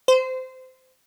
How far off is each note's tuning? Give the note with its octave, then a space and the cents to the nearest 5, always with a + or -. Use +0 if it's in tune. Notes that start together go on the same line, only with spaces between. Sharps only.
C5 -20